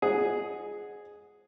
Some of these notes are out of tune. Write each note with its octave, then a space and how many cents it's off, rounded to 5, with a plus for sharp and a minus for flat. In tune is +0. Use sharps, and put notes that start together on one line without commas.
G#4 +0 D#5 -35 F#5 -5